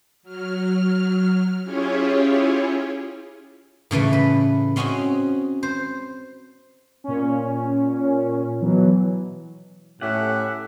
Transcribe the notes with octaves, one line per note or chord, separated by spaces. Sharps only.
F#3 F6
C#4 E4 F4 G4 G#4 C#5
A2 C#3 E3 A3
B4
C4 C#4 F#4 G#4 D#5
C5
A#2 C#4
B2 E3 F#3
A2 C#4 G4 E5 F#5